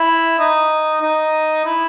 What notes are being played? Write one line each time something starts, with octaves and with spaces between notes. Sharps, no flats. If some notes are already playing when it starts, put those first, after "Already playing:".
Already playing: E4
D#4
D#4
E4